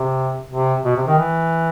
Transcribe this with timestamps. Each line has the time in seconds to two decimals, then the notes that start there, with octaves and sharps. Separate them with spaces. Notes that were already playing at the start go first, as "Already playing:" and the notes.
Already playing: C3
0.51 C3
0.85 B2
0.96 C3
1.07 D#3
1.18 E3